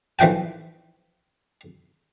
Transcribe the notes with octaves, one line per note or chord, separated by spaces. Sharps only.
B1 E3 F3 G5 G#5